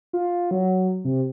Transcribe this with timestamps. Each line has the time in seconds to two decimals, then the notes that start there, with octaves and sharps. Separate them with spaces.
0.13 F4
0.51 F#3
1.05 C3